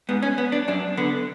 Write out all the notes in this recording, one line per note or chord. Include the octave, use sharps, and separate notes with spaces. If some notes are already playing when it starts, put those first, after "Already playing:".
G#2 B3
C#4
B3
D4
F#2 D4
D3 B3